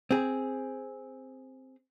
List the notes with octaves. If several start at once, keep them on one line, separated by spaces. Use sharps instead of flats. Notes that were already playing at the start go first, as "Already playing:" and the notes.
C4 G#4